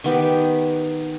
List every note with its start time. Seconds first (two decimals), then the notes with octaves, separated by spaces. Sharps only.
0.04 D#3 B3 G4